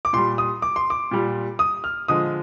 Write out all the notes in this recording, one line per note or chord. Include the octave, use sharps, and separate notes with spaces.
D6
A#2 G3 C6
D#6
D6
C6
D6
A#2 G3
D#6
F6
D3 F3 G#3 D#6